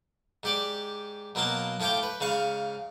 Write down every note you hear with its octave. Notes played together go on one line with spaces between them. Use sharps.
G#2 G4 D5
B2 F#3 A#3 F4 A5 C6
A2 F4 C#5 G5 D6
B4
G#2 C#3 F5 C#6